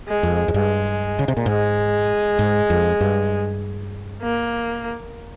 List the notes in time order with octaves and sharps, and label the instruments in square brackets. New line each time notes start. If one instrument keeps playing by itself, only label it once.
[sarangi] G#3
[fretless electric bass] F2
F2
[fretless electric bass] G2 [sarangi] G#3
[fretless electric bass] C#3
C3
A#2
[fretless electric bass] G#2 [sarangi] G#3
[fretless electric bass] G#2
F2
G2
[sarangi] A#3